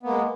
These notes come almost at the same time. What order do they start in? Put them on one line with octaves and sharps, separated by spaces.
B3 A#3 G#3